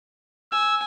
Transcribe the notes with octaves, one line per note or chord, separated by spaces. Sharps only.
G#5 E6